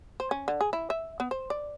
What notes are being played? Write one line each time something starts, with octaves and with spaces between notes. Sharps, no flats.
C5
C#4
D3
G#4
E4
E5
B3
C5
D5